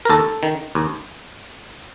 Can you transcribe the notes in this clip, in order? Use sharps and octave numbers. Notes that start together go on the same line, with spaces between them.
A#4
D#2 A4
D#3
D#2